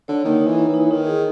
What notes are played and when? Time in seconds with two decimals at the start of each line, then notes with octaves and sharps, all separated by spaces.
0.08 D3 C#5
0.25 D#3 A#3
0.41 D#4
0.47 E3
0.58 C#5
0.69 E3
0.74 D#4
0.91 D#3 D#4
1.07 G#4